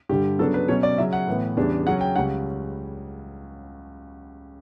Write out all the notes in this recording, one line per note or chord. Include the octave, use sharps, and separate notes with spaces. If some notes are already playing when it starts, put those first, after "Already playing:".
G2 D3 G3 G4
C#3 F#3 B3 D4 A4
B4
B2 F#3 C#4 C#5
D5
C#3 F#3 C#4 E5
F#5
A2 E3 B3
E2 C#3 G3 B3 D4
C#3 F#3 C#4 F#5
G5
C#2 C#3 G3 C#4 F#5